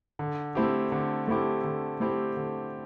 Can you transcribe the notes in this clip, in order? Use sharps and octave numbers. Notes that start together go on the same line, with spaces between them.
D3
A3 C4 E4 G4
D3
A3 C4 E4 G4
D3
A3 C4 E4 G4
D3